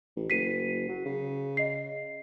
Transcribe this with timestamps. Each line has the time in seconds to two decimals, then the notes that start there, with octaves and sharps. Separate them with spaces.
0.16 A1
0.30 F#1 B6 C7 D#7
0.88 F#3
1.05 C#3
1.57 D#5 C7